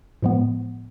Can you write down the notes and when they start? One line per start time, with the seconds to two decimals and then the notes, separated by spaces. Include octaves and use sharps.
0.22 A2 F3 G#3 B3